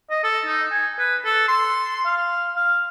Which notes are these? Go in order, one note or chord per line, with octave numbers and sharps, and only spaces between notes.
D#5
A4
D#4
G#5
B4
A4
C6
F5
F5